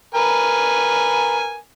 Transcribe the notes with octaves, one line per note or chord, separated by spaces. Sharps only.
A#4 B4 G#5